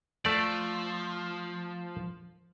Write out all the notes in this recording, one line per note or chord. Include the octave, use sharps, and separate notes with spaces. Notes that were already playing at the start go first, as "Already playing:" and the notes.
F3 A3 D5